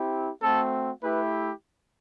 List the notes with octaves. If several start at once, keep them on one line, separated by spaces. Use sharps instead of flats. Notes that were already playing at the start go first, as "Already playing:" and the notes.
Already playing: C4 E4 G4
A3 C4 F#4 A4
A3 E4 G4 B4